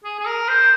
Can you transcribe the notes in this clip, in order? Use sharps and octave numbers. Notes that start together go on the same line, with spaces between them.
G#4
G#4
A#4
C5